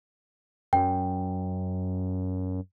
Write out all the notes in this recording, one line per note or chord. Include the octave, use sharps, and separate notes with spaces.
F#2 G5